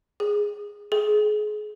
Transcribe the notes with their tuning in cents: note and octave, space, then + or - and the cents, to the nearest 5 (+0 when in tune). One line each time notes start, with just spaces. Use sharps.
G#4 -10
G#4 +30